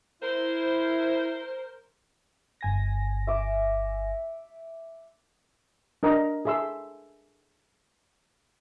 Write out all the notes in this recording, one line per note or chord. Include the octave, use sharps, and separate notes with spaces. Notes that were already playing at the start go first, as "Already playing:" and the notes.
E4 A#4 C5
G1 G#5 A#6
E5 D6
D4 A#4 D#5 A#5
G#4 A4 E5 C6 E6